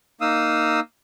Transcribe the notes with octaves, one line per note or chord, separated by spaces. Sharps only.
A#3 D#4 F5 D#6 E6